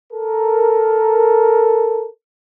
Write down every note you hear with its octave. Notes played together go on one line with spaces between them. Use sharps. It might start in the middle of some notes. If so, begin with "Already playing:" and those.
A4 A#4